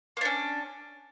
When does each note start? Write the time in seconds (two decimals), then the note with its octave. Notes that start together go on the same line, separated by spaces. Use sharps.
0.17 A#3
0.21 D4
0.25 C#4